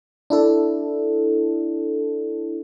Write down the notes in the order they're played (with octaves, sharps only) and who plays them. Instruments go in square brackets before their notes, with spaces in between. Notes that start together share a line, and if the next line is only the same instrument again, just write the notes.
[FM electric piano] D4 E4 A4